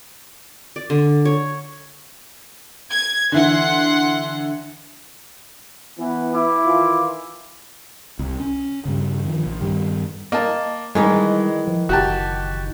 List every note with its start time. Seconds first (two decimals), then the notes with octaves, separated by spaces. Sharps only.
0.76 D5
0.90 D3
1.25 C#5
2.92 G#6
3.32 D3 E3 F#5 C6
5.99 E3 B3
6.34 E4 D6
6.66 D#3 E3 F4
8.19 C2
8.40 C#4
8.85 G2 C#3
9.25 D#3 F3
9.46 A#1
9.61 G2 D#3 G3
10.32 A#3 D#5 A5
10.95 D#3 E3 G3 G#3 D#4
11.68 F3
11.89 F#1 F#4 G4 A5